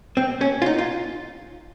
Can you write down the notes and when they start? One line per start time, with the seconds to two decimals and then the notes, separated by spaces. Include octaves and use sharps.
0.17 C4
0.41 C#4
0.62 F4
0.66 D#4
0.78 F4